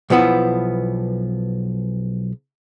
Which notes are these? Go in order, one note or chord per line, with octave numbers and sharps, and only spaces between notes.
B1 F3 B3 E4